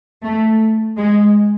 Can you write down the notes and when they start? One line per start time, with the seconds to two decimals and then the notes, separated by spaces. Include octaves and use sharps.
0.23 A3
0.97 G#3